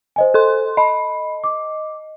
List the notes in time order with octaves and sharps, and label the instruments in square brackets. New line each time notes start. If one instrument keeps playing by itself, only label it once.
[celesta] C5 D#5 G#5
[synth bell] A4 C6
[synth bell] D#5 [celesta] B5
[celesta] D6